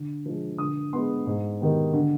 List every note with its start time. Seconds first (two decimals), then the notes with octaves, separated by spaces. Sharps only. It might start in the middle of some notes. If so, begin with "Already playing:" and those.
Already playing: D3
0.26 F3 G#3
0.58 D3 D#6
0.93 G#3 B3 C6
1.26 G#2
1.61 D#3 G3 B3
1.93 D3